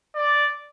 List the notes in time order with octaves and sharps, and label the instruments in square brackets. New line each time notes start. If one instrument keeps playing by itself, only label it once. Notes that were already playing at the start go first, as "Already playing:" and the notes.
[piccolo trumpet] D5